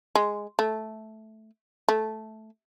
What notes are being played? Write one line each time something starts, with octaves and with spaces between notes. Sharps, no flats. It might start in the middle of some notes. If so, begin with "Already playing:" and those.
G#3
A3
A3